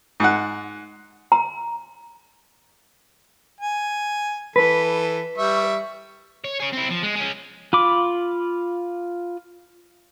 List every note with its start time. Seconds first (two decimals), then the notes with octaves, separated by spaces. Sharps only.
0.20 G#2 F#5
1.32 A#5
3.60 G#5
4.56 E3 A4 B4
5.38 G3 E5 C#6
6.44 C#5
6.60 G#4 C#5
6.73 C4 E4
6.90 F3
7.03 G#3
7.16 G#3 C#4
7.73 F4 B5 D6